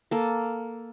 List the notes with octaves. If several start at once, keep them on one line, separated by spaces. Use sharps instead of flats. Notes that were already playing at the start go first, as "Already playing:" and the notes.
A#3 A4